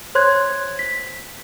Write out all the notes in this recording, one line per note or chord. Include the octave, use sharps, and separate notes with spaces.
C5 C#5 C6 F#6 G#6
B6